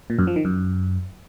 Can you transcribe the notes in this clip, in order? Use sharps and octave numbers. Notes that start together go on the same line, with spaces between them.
A#2
F#2
F3
D#3
F#2